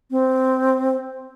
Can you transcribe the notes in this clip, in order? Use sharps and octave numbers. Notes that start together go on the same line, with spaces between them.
C4